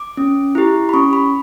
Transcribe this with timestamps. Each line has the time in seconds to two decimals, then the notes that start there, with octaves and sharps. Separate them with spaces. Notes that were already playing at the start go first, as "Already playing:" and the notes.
Already playing: D6
0.17 C#4
0.55 E4 G4
0.89 B5
0.94 C#4 C#6
1.13 B5